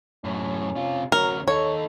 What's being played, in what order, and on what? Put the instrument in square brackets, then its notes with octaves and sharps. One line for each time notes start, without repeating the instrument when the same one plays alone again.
[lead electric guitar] F#2 A2 [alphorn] C#4
[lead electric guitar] C3 F4
[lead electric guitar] D2 C#4 [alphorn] F#3 [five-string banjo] A#4
[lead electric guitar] D#2 D#4 [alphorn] A4 [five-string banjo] C#5